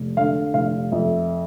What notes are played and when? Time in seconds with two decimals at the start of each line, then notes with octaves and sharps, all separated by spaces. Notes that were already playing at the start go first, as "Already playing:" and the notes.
Already playing: F1
0.17 D3 F5
0.54 F1 F5
0.92 F2 E5